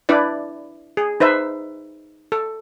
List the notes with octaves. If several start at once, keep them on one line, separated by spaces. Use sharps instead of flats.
D4 E4 B4 D5
G#4
D#4 B4 C5 E5
A4